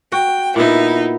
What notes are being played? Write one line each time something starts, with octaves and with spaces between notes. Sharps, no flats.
F#4 G5
A#2 B3 D#4 E4